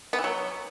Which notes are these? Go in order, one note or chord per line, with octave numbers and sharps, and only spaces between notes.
B3
E3
F#3